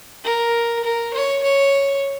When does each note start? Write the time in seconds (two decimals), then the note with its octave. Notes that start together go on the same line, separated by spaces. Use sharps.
0.24 A#4
0.84 A#4
1.14 C#5
1.43 C#5